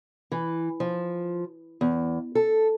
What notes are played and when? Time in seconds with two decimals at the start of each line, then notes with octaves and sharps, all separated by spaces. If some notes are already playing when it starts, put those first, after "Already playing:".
0.32 E3
0.80 F3
1.81 E2
2.35 A4